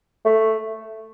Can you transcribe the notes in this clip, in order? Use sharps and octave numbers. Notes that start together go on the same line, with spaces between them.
A3